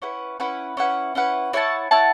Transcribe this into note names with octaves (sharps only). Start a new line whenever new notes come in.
C#4 E4 B4 F#5
C#4 E4 B4 F#5
C#4 E4 B4 F#5
C#4 E4 B4 F#5
E4 C#5 F#5 A5
E4 C#5 F#5 A5